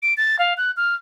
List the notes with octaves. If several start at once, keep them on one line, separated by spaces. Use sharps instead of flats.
D7
A6
F5
F#6
F6